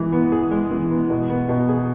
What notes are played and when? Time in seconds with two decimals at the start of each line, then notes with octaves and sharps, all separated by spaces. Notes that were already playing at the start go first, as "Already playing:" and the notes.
Already playing: E3 G#3
0.12 B3
0.32 G#4
0.51 G#3
0.71 E3
0.90 B3
1.10 B2
1.29 B3
1.49 B2
1.69 G#4